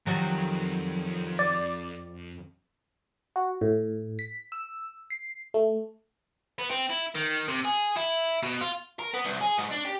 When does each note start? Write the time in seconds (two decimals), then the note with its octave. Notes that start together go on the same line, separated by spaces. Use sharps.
0.06 F2 D#3 F#3 G3
1.39 D5
3.36 F#4
3.61 A2
4.19 B6
4.52 E6
5.10 C7
5.54 A3
6.59 B3
6.70 C4
6.90 E4
7.15 D#3
7.48 C3
7.65 G#4
7.97 E4
8.43 B2
8.61 F4
8.99 A#4
9.14 B3
9.25 C2
9.41 G#4
9.58 G#2
9.71 D4
9.85 G4